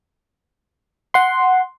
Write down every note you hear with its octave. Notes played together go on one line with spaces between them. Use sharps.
F#5 C6